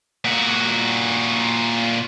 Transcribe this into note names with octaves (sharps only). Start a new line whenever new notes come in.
A#2 F#4